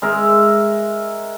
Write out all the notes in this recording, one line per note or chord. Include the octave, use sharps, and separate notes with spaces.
G#3 A#4 E5